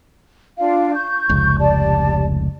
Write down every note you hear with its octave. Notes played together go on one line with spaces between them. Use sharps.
D4 F4 F5
C#6 G6
F1 C#2
G4 D5 A5